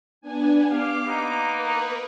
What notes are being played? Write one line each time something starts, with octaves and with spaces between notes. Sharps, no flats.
B3 D4 G#5
G4 F5 D6
A#3 B3 D#4
A#4 B4